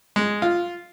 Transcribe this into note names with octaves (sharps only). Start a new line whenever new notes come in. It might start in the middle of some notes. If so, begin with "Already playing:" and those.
G#3
F4